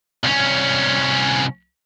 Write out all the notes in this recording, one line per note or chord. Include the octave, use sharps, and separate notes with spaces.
C2 C#4